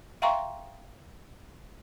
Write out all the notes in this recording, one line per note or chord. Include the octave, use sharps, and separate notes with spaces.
E5 F5 G5 A#5 C6 C#6